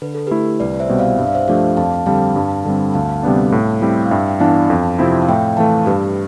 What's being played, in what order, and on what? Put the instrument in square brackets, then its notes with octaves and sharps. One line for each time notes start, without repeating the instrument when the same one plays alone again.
[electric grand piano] D3 [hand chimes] B4
[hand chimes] A4
[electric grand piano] A3 E4 [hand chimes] G4 B4
[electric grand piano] C2 [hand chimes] B4 D5
[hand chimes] C5 E5
[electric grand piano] B2 G3 C4
[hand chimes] D5 F5
[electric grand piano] G2 [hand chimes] E5
[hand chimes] F5
C5 E5
[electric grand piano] F3 A3 D4 G4 [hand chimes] D5 F5
[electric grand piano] F2 [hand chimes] F5 A5
[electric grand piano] D3 G3 C4 [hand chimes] F5 A5
[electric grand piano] G2
D3 G3 C4
[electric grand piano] D2 [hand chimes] F5 A5
[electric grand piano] C3 G3 B3 D4
A2
G3 C4 E4 G4
[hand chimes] F5
[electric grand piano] G2 [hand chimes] E5 G5
[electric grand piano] E3 B3 D4 [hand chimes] F5 A5
[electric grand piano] F2
C3 F3 C4 E4
[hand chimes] F5
[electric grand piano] A2 [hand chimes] E5 G5
[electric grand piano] E3 A3 [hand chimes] F5 A5
[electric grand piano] G2 [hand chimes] G4 B4